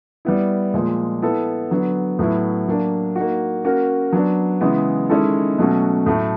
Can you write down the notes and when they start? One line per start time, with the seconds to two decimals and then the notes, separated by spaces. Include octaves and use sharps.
0.25 G3 B3 E4
0.74 A#2 F3 G#3
1.22 B3 E4 A4
1.70 D3 F#3 B3
2.19 A2 F#3 B3 E4
2.67 F#3 A#3 D4
3.16 A#3 D#4 F#4
3.64 A#3 C#4 F#4 A#4
4.13 F#3 B3 D4
4.61 C#3 E3 G#3 B3 E4
5.09 D#3 G#3 C#4 E4 A4
5.58 B2 F#3 A3 C#4 F#4
6.06 A2 F#3 A3